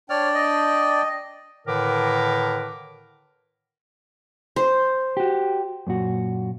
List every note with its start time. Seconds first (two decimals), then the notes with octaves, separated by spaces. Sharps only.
0.10 D4 C#5 D5 G5 F6
0.34 D#5
1.67 A2 D3 D#3 A#4 B4 D6
4.56 C5
5.17 F#4 G4
5.87 F#2 A#2 F#4